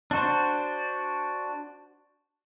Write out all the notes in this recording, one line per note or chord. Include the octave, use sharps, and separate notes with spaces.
D4 F#4 C5